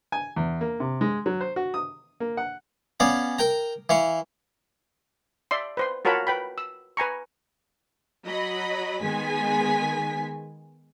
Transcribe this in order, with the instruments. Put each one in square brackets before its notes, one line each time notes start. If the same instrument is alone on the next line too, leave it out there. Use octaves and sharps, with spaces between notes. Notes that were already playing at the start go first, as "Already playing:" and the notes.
[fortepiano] G#5
E2
A#3
C3
G#3
F#3
C5
F#4
D#6
A#3
F#5
[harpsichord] B3 C#4 D5 F5
A#4 G5 A#5
E3 F5 C#6
[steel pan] D5 E5 C6
B4 C5 C6
F4 F#4 A#4 C#5 A5 B5
B4 G5 B5
E6
B4 G#5 A#5 C#6
[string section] F#3 D#5 B5
D#3 G#3 B3 G#5 B6